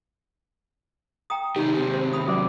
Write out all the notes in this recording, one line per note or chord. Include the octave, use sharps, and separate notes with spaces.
G5 A#5 D#6
C3 D#3 D#4 G4
D#2 C3 C4
C5
C4 B5 D#6
F#3 C#4 C5 D5 D6